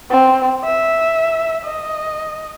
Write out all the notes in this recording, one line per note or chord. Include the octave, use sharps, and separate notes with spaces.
C4
E5
D#5